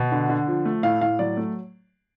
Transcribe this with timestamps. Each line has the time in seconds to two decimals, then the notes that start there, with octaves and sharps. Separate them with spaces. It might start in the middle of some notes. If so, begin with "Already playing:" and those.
Already playing: B2
0.12 D3
0.29 D3
0.47 F3
0.65 A3
0.83 A2 F5
1.01 A2 F5
1.19 F#3 D5
1.37 A3